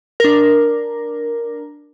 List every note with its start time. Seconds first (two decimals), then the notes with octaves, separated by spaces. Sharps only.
0.20 D4 A#4